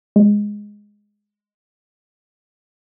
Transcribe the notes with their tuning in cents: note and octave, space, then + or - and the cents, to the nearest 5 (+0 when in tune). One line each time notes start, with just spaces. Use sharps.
G#3 -5